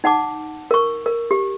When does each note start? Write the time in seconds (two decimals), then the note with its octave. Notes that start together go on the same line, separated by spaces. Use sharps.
0.04 D#4 F#5 A5 D6
0.71 A#4 C#6
1.06 A#4
1.31 G4